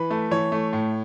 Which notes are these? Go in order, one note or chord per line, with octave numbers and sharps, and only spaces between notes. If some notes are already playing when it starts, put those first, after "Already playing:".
Already playing: E3 B4
A3
E3 C#5
A3
A2